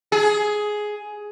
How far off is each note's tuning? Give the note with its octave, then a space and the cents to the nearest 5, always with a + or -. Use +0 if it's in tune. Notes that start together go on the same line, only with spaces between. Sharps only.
G#4 +10